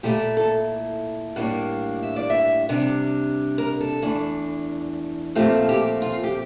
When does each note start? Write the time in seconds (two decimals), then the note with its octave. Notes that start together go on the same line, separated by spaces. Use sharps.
0.03 A#2 A3 E4 G4
0.37 A4
1.36 A2 G3 A#3 D4
2.03 E5
2.16 D5
2.30 E5
2.69 C3 G3 D4
3.58 A#4
3.81 A4
4.02 E2 E3 A3 D4
5.35 A#2 F3 A3 C4 G4
5.69 G4
6.02 F4
6.24 G4